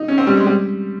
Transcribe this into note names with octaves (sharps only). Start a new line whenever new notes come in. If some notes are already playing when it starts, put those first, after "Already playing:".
Already playing: D#4
C#4
C4
G3
G#3
G3